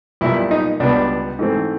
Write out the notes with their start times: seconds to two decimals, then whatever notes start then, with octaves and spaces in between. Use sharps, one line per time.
0.21 B1 A#2 G3 E4
0.51 D#4
0.80 C#2 B2 G3 B3 D4
1.39 G#2 E3 A3 C4